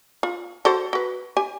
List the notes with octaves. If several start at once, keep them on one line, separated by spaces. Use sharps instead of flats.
F4
F#4 A4 C5
F#4 B4
G4 G#5